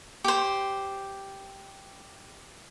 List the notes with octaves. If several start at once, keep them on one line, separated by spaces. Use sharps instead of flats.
G4 C5